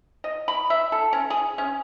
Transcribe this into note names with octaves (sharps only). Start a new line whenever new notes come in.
D#5
B5
E5
A4
C#4
G#4
C#4